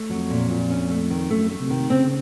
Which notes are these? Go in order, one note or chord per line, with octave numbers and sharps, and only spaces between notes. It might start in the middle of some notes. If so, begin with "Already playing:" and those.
Already playing: A3
F2 F#3
A#2
A#2
C#4
A3
D#3
F#2 A3
A3
C3
D#3
C#3 C4